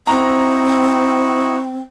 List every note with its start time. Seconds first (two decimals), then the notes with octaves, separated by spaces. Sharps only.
0.07 C4 D#4 E4 F#4 A#5